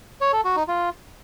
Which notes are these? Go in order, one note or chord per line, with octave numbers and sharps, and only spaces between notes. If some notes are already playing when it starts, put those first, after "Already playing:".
C#5
A4
F#4
D#4
F4